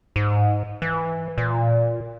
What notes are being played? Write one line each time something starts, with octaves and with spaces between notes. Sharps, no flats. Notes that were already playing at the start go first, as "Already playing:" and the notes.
G#2
E3
A#2